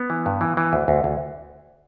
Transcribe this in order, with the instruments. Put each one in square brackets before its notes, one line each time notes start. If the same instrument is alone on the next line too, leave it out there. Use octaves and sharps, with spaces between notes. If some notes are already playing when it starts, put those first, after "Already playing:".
Already playing: [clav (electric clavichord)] B3
E3
G2
E3
E3
D2
D2
D2